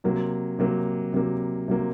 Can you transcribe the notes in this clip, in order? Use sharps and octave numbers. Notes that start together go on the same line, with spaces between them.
C3 F#3 A#3
C3 F#3 A#3
C3 F#3 A#3
C3 F#3 A#3